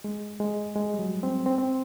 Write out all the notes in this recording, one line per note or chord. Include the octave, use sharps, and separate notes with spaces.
G#3
G#3
G#3
G3
F#3
C4
C4
C4